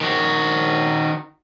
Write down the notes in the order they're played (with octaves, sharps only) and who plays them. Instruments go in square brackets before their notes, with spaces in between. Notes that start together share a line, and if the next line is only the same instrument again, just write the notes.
[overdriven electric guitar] D#3 F#4